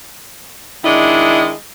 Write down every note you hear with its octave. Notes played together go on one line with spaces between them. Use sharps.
D#3 G#3 D4 E4 D#5